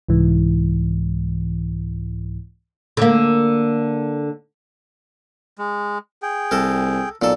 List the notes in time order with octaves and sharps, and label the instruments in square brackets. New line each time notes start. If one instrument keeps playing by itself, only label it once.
[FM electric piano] C2 G#2 E3
[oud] D3 A#3
[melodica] G#3
G#4 G5
[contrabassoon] C2 [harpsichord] A4 A#4
[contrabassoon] B1 [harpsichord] A#2 A4